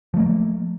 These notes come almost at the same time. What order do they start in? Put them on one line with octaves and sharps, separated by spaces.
F3 A3 A#3